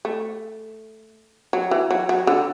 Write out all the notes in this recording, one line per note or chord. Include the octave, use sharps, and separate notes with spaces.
A3
F#3
E3
F#3
F#3
D3